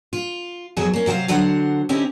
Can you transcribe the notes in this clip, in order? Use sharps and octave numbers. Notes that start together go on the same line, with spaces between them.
F4
F2 F#3 B3 F#4 G#4
A#3 C#4
C3 F#3 G4 C5 F5
D3 F#3 F#4 C5 F#5
D3 C4 C#4 D#4 E4 G4